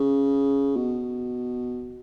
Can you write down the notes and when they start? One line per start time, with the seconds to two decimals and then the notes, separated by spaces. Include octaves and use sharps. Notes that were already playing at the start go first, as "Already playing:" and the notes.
Already playing: C#3
0.76 B2